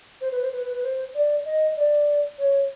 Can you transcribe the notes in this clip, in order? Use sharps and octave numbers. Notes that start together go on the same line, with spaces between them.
C5
B4
C5
B4
B4
B4
C5
D5
D#5
D5
C#5